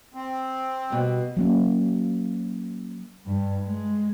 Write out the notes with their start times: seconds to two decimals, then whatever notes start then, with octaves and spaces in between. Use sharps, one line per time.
0.14 C4
0.90 B2 G3
1.37 F#3 A#3 C#4
3.26 G2
3.65 G#3